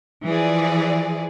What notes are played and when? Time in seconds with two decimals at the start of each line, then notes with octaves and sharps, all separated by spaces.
0.25 E3 F3 G#4 D5